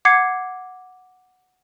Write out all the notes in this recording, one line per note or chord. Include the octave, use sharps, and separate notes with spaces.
F#5 D6 G#6 C7 C#7